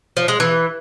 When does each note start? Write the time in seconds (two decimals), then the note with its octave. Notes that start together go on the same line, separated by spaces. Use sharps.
0.17 F3
0.28 G#3
0.40 E3